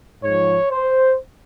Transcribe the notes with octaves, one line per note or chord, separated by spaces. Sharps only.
G#2 F3 C#5
C5